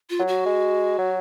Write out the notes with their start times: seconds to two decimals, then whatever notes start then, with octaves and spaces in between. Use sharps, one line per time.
0.10 F4
0.19 F#3
0.28 F#4
0.46 G#3
0.98 F#3